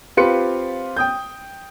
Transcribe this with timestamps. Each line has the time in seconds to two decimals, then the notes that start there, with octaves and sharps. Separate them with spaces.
0.17 C4 F4 G4 B4 C6 C#7
0.97 G5 D#6 G6